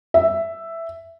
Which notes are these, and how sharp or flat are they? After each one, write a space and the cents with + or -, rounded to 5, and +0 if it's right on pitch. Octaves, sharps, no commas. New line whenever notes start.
E5 +5